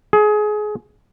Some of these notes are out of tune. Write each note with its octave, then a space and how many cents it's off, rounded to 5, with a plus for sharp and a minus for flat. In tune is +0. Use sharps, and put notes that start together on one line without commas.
G#4 +25